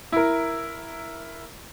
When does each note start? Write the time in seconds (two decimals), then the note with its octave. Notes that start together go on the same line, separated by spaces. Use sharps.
0.12 E4 A#4